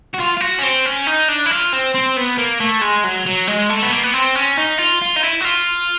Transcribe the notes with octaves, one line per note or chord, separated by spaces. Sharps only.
F#4
F4
F4
F#4
C#4
C4
C#4
D#4
D4
E4
F4
C4
C4
B3
A#3
A3
G#3
F#3
F#3
G#3
A3
B3
A#3
B3
C4
C#4
D#4
F4
F4
D#4
E4
F#4
F4